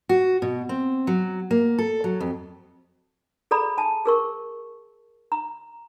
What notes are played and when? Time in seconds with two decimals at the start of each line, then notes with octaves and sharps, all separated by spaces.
0.09 F#4
0.42 B2
0.69 C4
1.07 F#3
1.51 A#3
1.78 A4
2.04 F#3
2.20 F2
3.51 G#4 A4 D5 A#5 B5
3.78 G#5 A5
4.05 G#4 A#4 C#6
5.32 A#5